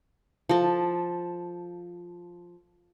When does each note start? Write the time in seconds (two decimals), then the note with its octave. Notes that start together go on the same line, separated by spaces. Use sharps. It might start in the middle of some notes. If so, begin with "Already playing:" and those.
0.49 F3 A4